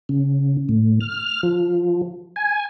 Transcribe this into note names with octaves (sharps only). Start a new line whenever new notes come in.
C#3
A2
F6
F3
G#5